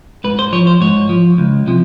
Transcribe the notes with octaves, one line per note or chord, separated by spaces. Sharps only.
G#2 B4
C5
F3 C#5
C5
G#2 C#5
F3
C#2
C3 F3